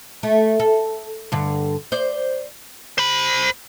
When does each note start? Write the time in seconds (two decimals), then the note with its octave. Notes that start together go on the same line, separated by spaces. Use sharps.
0.23 A3
0.60 A4
1.32 G2 D3
1.92 C5 D5
2.98 C5 B5